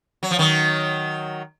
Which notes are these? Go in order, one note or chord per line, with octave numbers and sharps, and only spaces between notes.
F#3
F3
D#3 F#3